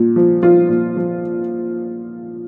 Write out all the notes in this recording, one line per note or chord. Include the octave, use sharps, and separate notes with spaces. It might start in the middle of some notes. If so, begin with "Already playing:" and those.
Already playing: A#2
F3
F3 F4
A#2
F3